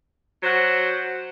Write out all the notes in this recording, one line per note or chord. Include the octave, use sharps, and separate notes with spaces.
F#3 F#4 C5